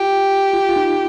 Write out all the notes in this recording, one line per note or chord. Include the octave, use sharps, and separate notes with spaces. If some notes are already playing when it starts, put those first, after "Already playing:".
Already playing: F4 G4
F4
F4
D#4